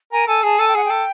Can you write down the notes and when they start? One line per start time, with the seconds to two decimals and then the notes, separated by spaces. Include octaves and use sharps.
0.12 A#4 G#5
0.28 A4 G#5
0.43 G#4 A5
0.59 A4 G#5
0.68 G5
0.75 G#4 F#5
0.85 G5
0.90 A4